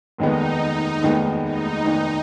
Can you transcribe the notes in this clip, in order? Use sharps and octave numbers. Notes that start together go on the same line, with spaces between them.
F1 D#2 D#3 G#3 B3 D#4
F1 D#2 D#3 G#3 B3
D#4
F1 D#2 D#3 G#3 B3